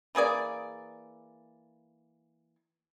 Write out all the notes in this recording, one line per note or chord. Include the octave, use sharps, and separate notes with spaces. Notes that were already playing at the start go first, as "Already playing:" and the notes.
E3 A#3 G#4 D5